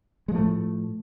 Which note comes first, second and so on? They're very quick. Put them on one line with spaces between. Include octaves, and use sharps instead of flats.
G#3 F3 A3 A2